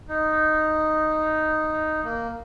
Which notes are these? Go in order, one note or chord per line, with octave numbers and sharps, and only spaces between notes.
D#4
A#3